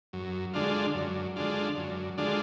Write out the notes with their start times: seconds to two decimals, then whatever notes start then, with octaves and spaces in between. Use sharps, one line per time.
0.13 F#2
0.53 D3 G#3 D4 F4
0.94 F#2
1.36 D3 G#3 D4 F4
1.77 F#2
2.18 D3 G#3 D4 F4